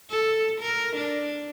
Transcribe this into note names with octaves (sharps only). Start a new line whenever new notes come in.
A4
A#4
D4